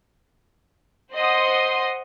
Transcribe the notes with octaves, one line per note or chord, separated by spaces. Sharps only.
C5 D#5 F#5 C6 D#6